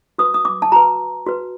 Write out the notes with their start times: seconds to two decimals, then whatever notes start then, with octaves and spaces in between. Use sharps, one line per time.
0.18 F#4 B4 D#6
0.34 D#6
0.45 D6
0.62 A5
0.72 F#4 B4 A#5
1.26 F#4 B4